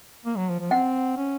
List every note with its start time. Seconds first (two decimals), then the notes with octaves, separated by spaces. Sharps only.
0.26 A#3
0.37 F#3
0.49 F3
0.60 F3
0.71 C4 F#5
1.17 C#4